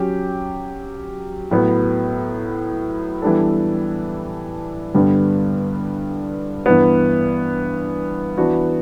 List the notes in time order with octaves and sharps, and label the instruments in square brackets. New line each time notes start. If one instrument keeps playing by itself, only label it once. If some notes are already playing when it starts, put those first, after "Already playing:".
Already playing: [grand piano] F#3 C#4 G4
A2 F#3 B3
E3 G3 B3 D4 A4
G2 D3 G3 B3
G2 E3 B3
E3 B3 D4 F#4